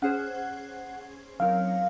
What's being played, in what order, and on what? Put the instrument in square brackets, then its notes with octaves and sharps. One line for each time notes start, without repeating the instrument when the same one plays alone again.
[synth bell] C#4 G#4 C5 [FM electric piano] F#5
[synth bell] F#3 C4 D#4 A#4 C#5 [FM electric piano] F5